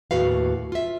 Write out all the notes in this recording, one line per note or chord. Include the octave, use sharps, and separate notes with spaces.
D#2 A2 F#4 B4 F5
F4 E5